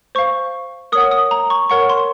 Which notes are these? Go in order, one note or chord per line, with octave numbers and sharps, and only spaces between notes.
C5 F5 C#6
A#4 C#5 F#5 D#6
D#6
A#5
C#6
A#4 C#5 F#5 C#6
C6